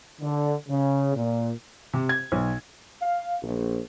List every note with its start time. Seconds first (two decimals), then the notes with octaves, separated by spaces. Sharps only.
0.21 D3
0.69 C#3
1.16 A#2
1.93 C3
2.09 G#6
2.32 B1
3.02 F5
3.43 A#1